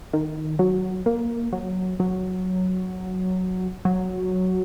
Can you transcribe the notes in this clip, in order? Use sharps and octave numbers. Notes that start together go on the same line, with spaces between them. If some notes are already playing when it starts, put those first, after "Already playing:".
D#3
F#3
A#3
F#3
F#3
F#3